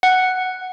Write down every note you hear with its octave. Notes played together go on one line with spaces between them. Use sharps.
F#5